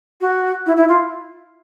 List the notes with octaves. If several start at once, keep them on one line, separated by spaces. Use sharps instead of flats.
F#4
E4
E4
F4